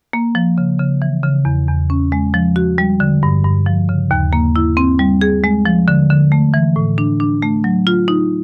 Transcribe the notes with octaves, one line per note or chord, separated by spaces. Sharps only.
A#3
F3
C#3
C#3
E3
C#3
E2
E2
C#4
G#3
F3
F#4
G3
D3
G2
G2
F3
C#3
D#2
A#3
E4
C4
G3
G#4
G#3
F3
D3
D3
A3
E3
A2
D4
D4
A3
F#3
F4
D#4